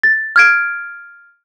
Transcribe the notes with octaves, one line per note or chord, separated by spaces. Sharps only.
A6
F6 G#6 D7